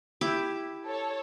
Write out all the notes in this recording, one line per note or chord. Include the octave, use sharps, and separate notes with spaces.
E4 G4 D6
A4 C#5